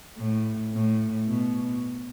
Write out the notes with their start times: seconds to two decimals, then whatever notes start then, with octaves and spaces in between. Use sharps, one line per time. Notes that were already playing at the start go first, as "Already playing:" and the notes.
0.17 A2
0.72 A2
1.28 B2